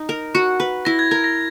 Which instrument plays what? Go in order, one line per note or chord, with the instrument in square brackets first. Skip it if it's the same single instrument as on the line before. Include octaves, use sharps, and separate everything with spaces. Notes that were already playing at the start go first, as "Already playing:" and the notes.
Already playing: [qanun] D#4
A#4
F#4
B4
[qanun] E4 [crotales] A#6
[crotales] G#6
[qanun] A#4 [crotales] G#6
[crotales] A#6